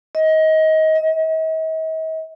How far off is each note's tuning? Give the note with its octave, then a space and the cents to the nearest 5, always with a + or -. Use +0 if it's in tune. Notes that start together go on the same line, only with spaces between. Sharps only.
D#5 +25
D#5 +45